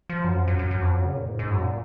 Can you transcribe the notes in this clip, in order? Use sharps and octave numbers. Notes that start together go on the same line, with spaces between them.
F3
F#2
F2
F#2
F#2
F#2
F2
F#2
C#3
A#2
G#2
G#2
F#2
A#2